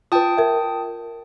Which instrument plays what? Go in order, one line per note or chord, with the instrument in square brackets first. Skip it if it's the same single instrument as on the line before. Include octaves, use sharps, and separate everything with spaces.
[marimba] F4 B4 [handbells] G5 A5 D#6
[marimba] A#4 E5